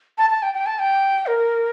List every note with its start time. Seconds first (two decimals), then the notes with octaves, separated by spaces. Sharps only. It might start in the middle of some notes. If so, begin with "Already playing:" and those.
0.18 A5
0.30 A5
0.43 G5
0.54 G5
0.66 A5
0.79 G5
1.27 A#4